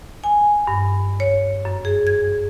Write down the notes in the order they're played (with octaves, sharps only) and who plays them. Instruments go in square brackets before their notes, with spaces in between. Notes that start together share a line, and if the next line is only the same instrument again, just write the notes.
[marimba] G#5
G2
C#5
F#2
G#4
G#6